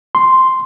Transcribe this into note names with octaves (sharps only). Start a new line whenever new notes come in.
C6